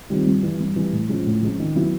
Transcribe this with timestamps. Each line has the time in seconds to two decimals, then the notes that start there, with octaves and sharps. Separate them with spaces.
0.10 D#3 G3 C4 F4
0.27 G2
0.43 E3 G3
0.60 G2
0.76 E3 G3
0.92 A2
1.09 F3 G#3 C#4 F4
1.26 A2
1.43 F3 G#3 C#4 F4
1.60 D#3
1.76 F#3 B3 E4